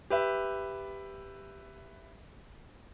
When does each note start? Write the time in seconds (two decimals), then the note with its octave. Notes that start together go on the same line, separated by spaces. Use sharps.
0.10 G4 B4 E5